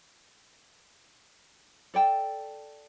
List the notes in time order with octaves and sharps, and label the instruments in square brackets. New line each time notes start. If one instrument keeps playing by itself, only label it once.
[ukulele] A4 D5 G5 A5